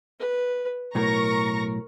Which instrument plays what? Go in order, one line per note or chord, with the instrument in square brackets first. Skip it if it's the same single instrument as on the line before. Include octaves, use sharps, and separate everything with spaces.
[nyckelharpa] B4
[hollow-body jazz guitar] B1 A2 [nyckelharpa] A#4 [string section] A#5 C#6 A#6